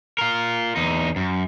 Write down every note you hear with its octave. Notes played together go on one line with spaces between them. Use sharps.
F4 A#4
E2 D#4
F#2